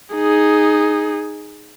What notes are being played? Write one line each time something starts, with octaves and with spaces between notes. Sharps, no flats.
D#4 G#4